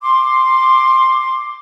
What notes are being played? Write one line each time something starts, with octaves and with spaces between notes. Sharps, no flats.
C6 D6